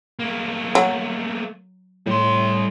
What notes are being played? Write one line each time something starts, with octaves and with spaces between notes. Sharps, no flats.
A3 A#3
F#3
A2 G3 C6